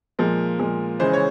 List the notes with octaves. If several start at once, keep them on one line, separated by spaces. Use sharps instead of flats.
A#2 F3 G#3 A#4
A#2 F3 G#3
C#3 E3 G#3 C5
C#5